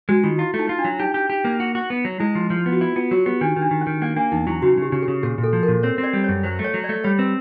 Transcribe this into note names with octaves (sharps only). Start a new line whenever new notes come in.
G#3 F#4
D#3 F4
E4 F4
A3
D#4
F4
D4
F#3
D#4 G4
G4
G4
A#3
F#4
F#4
B3
F#3
G#3 E4
F3
F3
B3
F#4
E4 F4
B3 F4
F#3 F#4
B3 G4
D#3 D4
D#3
D4
D#3
C#4
D#3
A#3 C#4
A#3 D4
E2 D#4
F#3 E4
C#3 F#4
C#3 G4
C#3
G#4
C#3
A#2 G#4
A#2
A4
F3
A#4
A#2
C4 C#5
C4
D5
G3
C#5
F#2
F#3 C5
A3
C#5
F#3
D5
A3
G3 C#5
C4 B4